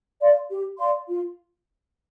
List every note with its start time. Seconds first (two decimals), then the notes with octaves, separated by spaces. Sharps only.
0.21 D5 F5 C6
0.51 G4
0.79 D5 F5 C6
1.08 F4